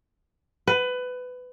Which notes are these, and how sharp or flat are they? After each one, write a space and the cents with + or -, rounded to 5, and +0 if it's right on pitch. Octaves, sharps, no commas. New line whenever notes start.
B4 +20